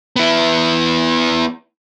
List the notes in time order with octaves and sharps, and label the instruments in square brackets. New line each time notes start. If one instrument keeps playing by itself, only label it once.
[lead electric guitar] B3 E4